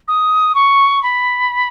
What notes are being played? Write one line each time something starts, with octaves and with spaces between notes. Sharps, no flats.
D#6
C#6
B5